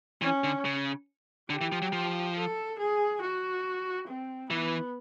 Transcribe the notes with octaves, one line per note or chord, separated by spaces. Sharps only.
E3 C#4
D3
C#3
D3 G4
E3
F3
F#3
F3
A4
G#4
F#4
C4
E3 B3